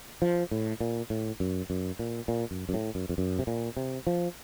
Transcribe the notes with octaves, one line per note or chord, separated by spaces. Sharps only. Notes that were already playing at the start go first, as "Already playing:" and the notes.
F3
A2
A#2
A2
F#2
F#2
A#2
A#2
F#2
F#2
A2
F#2
F2
F#2
C3
A#2
C3
F3